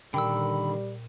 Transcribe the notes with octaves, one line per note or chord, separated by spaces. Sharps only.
A#2 D3 D#3 G3 G5 B5 E6